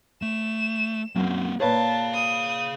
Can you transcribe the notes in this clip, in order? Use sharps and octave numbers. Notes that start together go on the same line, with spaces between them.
A3 E7
F#2 A#3 C4
A#2 G#4 B4 C#5 F5 A5
D#6